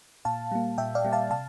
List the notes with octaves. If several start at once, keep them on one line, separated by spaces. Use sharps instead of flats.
A#2 F5 A5
G3 A#3
A#2 E5 G5
D5 F5
G3 A#3
F5 A5
C3 F5 A5